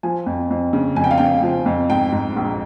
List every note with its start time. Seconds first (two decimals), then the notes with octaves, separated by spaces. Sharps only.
0.03 F3 G#5
0.26 F2
0.51 F2
0.73 C#3
0.96 F2 G#5
1.04 G5
1.11 F5
1.18 C#3 G5
1.43 F3
1.66 F2
1.90 G#2 G5
2.12 G#2
2.36 A#1